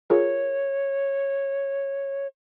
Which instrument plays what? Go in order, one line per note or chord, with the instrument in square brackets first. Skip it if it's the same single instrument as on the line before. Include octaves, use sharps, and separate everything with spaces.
[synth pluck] F4 G#4 A#4 [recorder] C#5